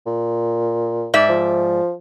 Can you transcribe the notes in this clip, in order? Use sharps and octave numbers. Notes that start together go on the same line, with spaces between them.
A#2
G#2 D5 E5
F3